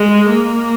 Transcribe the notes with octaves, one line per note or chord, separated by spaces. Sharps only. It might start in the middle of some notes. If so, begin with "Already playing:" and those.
Already playing: G#3
A#3